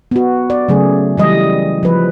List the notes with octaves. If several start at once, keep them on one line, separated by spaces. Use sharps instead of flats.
B3 F#4
D5
C#3 F#3 A3 G#4
E3 G3 D#5
F3 B4